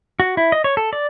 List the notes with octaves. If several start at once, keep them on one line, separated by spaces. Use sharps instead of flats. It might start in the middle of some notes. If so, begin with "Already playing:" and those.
F#4
E4
D#5
C#5
A4
D5